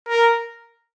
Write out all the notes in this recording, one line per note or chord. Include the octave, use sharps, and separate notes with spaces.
A#4